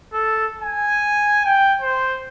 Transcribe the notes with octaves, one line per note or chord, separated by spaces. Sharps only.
A4
G#5
G5
C5